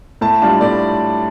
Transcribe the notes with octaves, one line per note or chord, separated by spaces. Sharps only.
A2 A5
G3 D4 F4 A5
A2 D5